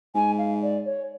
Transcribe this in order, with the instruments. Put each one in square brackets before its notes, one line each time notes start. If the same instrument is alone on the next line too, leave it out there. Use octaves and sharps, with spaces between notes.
[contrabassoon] G#2 [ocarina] G#5
[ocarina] F5
D5
C#5